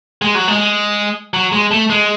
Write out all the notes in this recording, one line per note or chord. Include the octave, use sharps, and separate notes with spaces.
G#3
F#3
G#3
F#3
G#3
A3
G#3